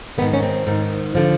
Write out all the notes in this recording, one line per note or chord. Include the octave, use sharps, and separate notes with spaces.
G#2 D#3 B3
C#4
C4
G#2 D#3
D3 F3